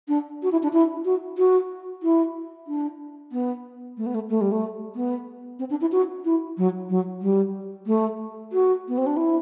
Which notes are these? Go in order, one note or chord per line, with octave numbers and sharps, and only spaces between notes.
D4
F#4
E4
D4
E4
F#4
F#4
E4
D4
B3
A3
B3
A3
A3
G3
A3
B3
C4
D4
E4
F#4
E4
F#3
F#3
G3
A3
F#4
B3
C4
D4
E4